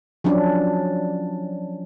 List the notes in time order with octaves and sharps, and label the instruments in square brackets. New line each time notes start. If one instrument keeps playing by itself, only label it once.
[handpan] F3 F#3 C#4 D4